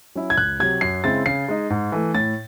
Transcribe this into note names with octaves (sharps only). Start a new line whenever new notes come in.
F#3 C#4 E4
G#6
C#2 F#6
C3 F#3 G#6
F#2 C7
C#3 G#3 C4 E4 A6
C#3 C7
G#3 D#4
G#2
E3 A3
A2 A6